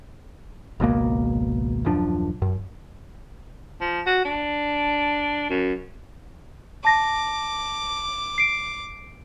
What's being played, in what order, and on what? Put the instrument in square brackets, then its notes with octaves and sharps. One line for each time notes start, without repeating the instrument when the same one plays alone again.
[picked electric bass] G#1 C#2 B2 A#3
D#1 F#2 F3 D4
F#2
[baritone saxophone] F3
F#4
D4
F#2
[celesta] A5 A#6 [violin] D6
[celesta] C7 D7